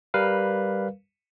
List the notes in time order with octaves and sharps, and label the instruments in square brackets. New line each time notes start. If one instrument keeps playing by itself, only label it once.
[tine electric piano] G3 A#4 B4 F5